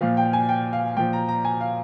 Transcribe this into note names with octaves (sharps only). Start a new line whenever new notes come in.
A#2 F3 F5
G5
G#5
G5
F5
A#2 F3 G5
A#5
A#5
G#5
F5